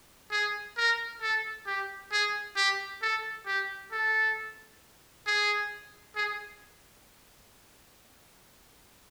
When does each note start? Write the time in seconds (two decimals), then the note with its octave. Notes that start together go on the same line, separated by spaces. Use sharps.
0.31 G#4
0.78 A#4
1.21 A4
1.67 G4
2.12 G#4
2.56 G4
3.02 A4
3.46 G4
3.92 A4
5.27 G#4
6.16 G#4